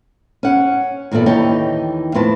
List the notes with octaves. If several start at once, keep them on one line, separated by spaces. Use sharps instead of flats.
C#4 F#5
E2 A#2 E3 A4 D5
D#2 E3 D#4 C#5 G5 A5
F2 A2 C4 B4 A5